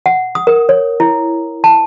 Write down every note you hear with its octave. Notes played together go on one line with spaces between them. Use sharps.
F#5
D#6
A#4
C#5
E4
A5